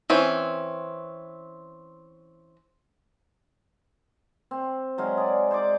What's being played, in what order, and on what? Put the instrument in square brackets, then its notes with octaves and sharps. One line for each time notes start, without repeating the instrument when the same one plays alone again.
[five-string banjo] E3 C4 C#4
[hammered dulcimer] C4
F#3 G#3 F5
G#4 D5
C5 D5 D6